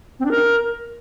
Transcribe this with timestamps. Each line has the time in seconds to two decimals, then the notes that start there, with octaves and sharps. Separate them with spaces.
0.20 C4
0.25 D4
0.31 A#4